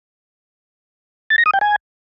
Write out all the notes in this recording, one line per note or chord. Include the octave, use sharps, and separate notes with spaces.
A6
A#6
D#6
G5
G#5